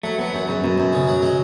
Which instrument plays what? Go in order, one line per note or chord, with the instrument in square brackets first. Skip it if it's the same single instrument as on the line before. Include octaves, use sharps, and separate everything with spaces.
[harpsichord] F#3 [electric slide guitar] A3
[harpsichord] F#3 [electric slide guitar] B3
[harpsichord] F#2
[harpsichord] F#2 [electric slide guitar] C#3
[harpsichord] F#2 [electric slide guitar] B2
[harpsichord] F#2
C#3
F#3
G#3